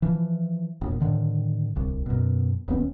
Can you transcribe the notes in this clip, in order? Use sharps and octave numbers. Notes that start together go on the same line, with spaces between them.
E3 F3
E1 A#2
A2 D3 D#3
D1 C2
F#2 B2
D1 D#2 B3 C#4